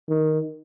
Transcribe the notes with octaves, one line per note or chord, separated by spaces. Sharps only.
D#3